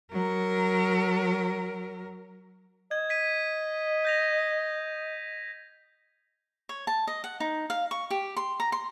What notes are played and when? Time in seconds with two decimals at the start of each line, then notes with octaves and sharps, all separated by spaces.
0.12 F#3 A#4
2.91 D#5 G#6
3.10 G#6 B6 D#7
4.05 G6 A#6 F7
6.69 C#5
6.87 A5
7.07 D#5
7.24 F#5
7.40 D#4
7.70 F5
7.91 C#6
8.10 G4
8.36 C6
8.60 A#5
8.72 C6